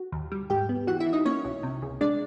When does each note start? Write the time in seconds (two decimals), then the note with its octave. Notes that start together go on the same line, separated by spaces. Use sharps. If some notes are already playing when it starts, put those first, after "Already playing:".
Already playing: F#4
0.12 D#2
0.32 G3
0.50 G#2 G4 G5
0.69 B3
0.87 E3 F#4 F#5
1.00 E4 E5
1.07 E3
1.13 D#4 D#5
1.25 A#3 C#4 C#5
1.44 B1
1.63 C3
1.82 C#2
2.01 G#3 D4 D5